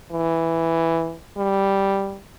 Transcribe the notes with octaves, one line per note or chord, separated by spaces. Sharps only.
E3
G3